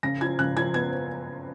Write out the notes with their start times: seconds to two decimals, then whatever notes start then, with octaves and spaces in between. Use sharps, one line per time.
0.03 C#3 A#6
0.21 F3 G#6
0.39 C#3 F#6
0.57 F3 G#6
0.74 B3 G#6